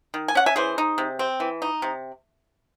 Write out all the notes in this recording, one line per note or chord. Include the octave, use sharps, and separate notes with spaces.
D#3
G#5
C#4 F#5
E5 G#5
E3 G#4 C5
D#4
C3
C4
E3
D#4
C3